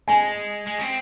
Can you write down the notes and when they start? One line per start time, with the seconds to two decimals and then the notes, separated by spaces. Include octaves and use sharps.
0.08 G#3 G#5
0.67 G#3
0.79 C#4
0.81 C4